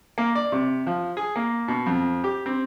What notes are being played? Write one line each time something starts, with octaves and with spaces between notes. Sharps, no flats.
A#3
D5
C3
F3
G#4
A#3
B2
F2
G4
C4